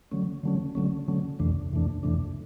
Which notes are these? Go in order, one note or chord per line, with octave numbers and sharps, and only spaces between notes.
D3 F#3 A3 C#4
D3 F#3 A3 C#4
D3 F#3 A3 C#4
D3 F#3 A3 C#4
F2 C3 E3 A3 D4
F2 C3 E3 A3 D4
F2 C3 E3 A3 D4